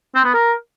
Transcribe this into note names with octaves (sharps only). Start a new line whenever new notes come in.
C4
B3
A#4